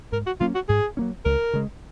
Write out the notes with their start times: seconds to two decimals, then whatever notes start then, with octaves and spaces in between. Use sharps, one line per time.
0.12 G#2 A#4
0.27 F#4
0.40 F#3 A#3 C#4 F4
0.55 F#4
0.69 G#2 G#4
0.97 F#3 A#3 C#4
1.25 C#2 A#4
1.53 C#3 G#3